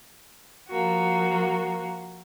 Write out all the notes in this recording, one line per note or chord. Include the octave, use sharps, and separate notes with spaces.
F3 A#3 F#4